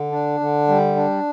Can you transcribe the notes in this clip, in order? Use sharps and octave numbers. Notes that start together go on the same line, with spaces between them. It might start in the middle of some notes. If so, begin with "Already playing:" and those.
Already playing: D3
D4
D3
G3
D4